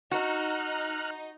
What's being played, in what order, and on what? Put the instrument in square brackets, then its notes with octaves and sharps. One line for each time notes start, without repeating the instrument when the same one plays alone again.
[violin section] D#4 [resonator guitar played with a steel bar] F#4 [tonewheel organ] A#5 F6 F#6